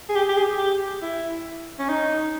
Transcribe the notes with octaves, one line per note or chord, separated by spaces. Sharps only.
G#4
G4
G4
G#4
G4
E4
C#4
D#4